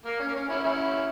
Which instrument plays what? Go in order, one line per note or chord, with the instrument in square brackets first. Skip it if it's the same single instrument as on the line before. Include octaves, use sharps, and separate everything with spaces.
[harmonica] A#3
C#4
A#3
C#4
C#4 E4
C#4 E4